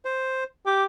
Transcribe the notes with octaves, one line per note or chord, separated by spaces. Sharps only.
C5
G4 D6